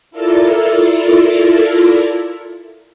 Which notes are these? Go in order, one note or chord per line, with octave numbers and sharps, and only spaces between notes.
E4 F4 A4 A#4 D5